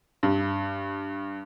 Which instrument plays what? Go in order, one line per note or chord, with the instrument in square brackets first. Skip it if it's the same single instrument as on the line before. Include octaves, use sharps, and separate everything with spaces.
[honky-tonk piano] G2